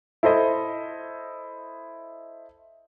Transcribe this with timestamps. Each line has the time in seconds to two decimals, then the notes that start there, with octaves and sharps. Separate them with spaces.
0.23 E4 A4 C5 D#5